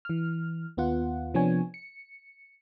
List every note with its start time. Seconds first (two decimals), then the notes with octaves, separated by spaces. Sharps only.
0.05 E3 F6
0.77 D#2 B3 F4 F#5
1.34 C3 F3 B3 D4 C#5 G#5
1.74 C#7